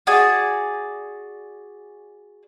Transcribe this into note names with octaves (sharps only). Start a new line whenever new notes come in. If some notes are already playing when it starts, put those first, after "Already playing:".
F#4 G#4 D5 G#5